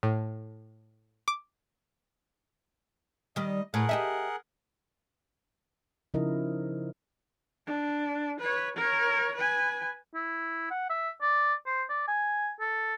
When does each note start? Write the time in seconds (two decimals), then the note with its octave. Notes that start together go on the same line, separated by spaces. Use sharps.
0.03 A2
1.28 D6
3.36 D#3 G3 D#5
3.74 A2 G#4 A#4 F#5
3.89 G4 D#5 E5
6.14 C#3 F3 D#4 E4 A#4 D#5
7.67 D4
8.40 B4 C#5
8.77 A#4 C#5
9.36 B4 G#5
10.14 E4
10.70 F#5
10.89 E5
11.22 D5
11.66 C5
11.89 D5
12.08 G#5
12.60 A4